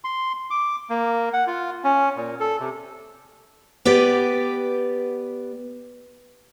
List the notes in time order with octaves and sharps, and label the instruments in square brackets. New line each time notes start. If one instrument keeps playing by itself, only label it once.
[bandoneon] C6
D6
A#3
F#5
F4
C#4
A#2
A4
C3
[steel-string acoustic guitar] B3 G4 B4 D5